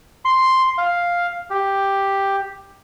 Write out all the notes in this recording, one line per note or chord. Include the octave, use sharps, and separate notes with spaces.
C6
F5
G4